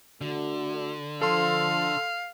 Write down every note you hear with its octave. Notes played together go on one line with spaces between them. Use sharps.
D3 A3 D4 F#4
F3 A4 F5 C6